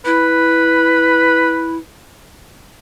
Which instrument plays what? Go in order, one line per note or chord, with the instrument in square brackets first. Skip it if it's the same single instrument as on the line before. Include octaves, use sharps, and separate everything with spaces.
[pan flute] E4 [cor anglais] B4